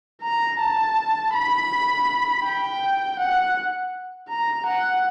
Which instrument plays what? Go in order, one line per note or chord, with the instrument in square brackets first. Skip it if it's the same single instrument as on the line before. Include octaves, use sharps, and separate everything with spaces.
[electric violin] A#5
A5
B5
G5
F#5
A#5
F#5